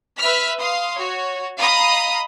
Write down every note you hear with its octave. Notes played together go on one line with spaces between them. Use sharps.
B4 E5 F6 B6
F5 C6 D#6
F#4 C#5
D#5 F5 A#5 B5 D#6